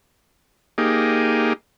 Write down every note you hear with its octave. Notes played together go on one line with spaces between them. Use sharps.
A#3 D#4 G4 G#4